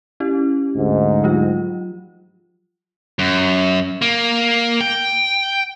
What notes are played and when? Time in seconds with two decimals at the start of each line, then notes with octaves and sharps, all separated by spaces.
0.20 C#4 E4 G4
0.75 D2 G#2
1.24 F3 F#3 F4
3.19 F#2
4.02 A#3
4.81 G5